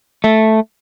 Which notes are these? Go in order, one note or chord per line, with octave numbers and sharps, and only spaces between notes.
A3